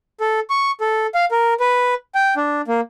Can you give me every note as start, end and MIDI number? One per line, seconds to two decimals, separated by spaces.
0.20 0.40 69
0.50 0.71 85
0.81 1.07 69
1.15 1.25 77
1.31 1.54 70
1.60 1.94 71
2.15 2.34 79
2.36 2.61 62
2.68 2.81 58